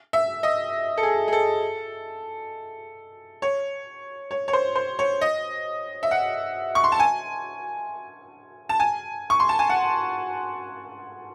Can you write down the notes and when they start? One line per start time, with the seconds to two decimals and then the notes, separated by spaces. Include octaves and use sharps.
0.13 E5
0.43 D#5
0.97 A4
1.03 G#4
1.28 G#4
1.33 A4
3.42 C#5
4.31 C#5
4.48 C#5
4.53 C5
4.75 C5
4.99 C#5
5.21 D#5
6.03 E5
6.11 F#5
6.75 C#6
6.84 C6
6.92 A5
7.00 G#5
8.69 A5
8.80 G#5
9.30 C#6
9.40 C6
9.49 A5
9.59 G#5
9.69 F#5